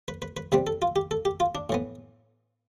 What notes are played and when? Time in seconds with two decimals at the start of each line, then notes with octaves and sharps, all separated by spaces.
0.08 B4
0.22 B4
0.37 B4
0.52 C3 G3 C4 B4
0.67 A4
0.82 F4
0.96 G4
1.11 A4
1.25 G4
1.40 F4
1.55 D4
1.70 A2 E3 B3